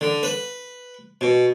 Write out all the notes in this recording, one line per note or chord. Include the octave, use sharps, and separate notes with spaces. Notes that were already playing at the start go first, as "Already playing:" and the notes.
D3
B4
B2